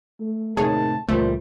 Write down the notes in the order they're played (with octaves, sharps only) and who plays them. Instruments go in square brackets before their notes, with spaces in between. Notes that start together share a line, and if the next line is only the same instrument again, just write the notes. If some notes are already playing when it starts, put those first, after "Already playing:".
[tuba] A3
[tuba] D#2 [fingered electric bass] A2 C3 A3 [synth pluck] G#4 C#5 [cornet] A5
[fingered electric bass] C#2 E3 G3 [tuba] A#2 [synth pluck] A3 [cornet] C5